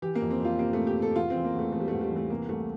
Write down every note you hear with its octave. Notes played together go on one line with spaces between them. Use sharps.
E3 G4
A#3
F2
C4
F2
F4
C3 A#3
C3 A3
G4
C3
A4
E2 F4
C4
E3
A#3
E2 A3
E2 A3
G3
E2 A3
G3
E3
A3
C3 A#3
C2 A3